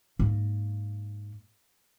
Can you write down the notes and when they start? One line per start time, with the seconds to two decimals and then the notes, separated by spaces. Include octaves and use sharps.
0.19 G#2 A#3